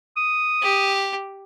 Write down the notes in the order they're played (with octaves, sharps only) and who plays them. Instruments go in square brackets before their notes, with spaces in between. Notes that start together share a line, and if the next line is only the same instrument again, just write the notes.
[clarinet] D#6
[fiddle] G4